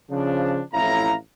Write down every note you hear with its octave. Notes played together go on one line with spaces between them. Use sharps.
C#3 F3 D4
A1 F2 A2 E4 F5 A#5